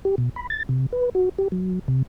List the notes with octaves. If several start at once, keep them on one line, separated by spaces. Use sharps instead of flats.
G4
B2
B5
A6
C3
B4
F#4
G4
F#3
C3